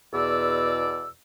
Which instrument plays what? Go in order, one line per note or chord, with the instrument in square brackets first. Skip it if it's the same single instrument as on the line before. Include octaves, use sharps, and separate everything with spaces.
[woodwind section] E2 B2 D5 E6